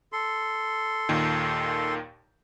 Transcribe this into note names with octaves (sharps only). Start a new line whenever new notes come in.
A4 C6
D#2 A#2 D#3